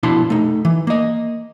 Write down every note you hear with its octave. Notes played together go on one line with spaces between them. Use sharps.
B2 F3 D4 E4 A5 C6
A3 D#4
E3
A#3 D#5